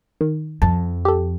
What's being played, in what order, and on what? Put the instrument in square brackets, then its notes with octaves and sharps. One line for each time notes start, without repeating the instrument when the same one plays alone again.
[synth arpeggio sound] D#3
[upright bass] F2 [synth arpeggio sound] A5
[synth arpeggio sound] G4 A4